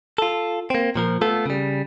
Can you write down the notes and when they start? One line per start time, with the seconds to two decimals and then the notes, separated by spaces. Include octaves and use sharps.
0.18 F4 A4
0.70 A#3 C4
0.95 A#2 F3 A#4
1.21 A3 B3 F4 A4
1.46 C#3 G3